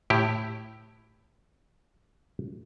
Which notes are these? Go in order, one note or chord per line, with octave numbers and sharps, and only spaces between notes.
A2 E4 G4